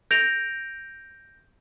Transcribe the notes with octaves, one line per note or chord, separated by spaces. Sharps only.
G6 A#6 D7 F7